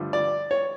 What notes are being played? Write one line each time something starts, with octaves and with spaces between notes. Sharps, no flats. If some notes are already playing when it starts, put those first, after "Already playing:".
Already playing: G2 D3 F3 A3
D5
C#5